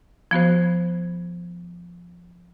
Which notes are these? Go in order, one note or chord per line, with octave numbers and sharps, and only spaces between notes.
F3 B3 F#4 C5